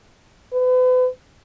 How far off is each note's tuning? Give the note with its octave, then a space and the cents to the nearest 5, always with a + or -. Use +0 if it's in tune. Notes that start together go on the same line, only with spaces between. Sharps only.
B4 +40